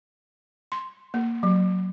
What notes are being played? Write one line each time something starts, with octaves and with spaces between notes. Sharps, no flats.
C6
A#3
F#3